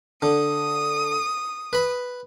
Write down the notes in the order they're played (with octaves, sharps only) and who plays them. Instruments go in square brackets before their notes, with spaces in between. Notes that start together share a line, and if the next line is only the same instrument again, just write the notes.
[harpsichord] D3 [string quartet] D#6
[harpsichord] B4 B5